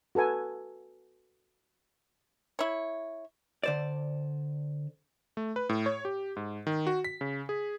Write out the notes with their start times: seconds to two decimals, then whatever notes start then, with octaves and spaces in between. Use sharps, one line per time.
0.15 F#4 A4 B4 G#5
2.59 E4 C#5
3.63 D3 C5 D5
5.37 A3
5.56 B4
5.69 A2
5.86 C#5
6.05 G4
6.37 G#2
6.67 D#3
6.87 F#4
7.05 B6
7.21 C#3
7.49 G#4